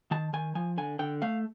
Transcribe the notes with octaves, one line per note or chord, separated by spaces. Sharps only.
D#3 A5
D#3 G#5
F3 G#5
D3 G#5
D3 G5
A3 F5